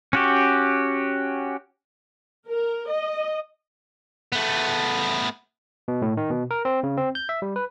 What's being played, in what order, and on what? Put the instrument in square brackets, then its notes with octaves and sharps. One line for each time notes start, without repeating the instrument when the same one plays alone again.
[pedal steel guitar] C#4 F#4 G4
[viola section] A#4
D#5
[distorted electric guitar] A3 B3
[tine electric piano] B2
A2
D#3
B2
A#4
C4
C#3
C4
G6
E5
G3
B4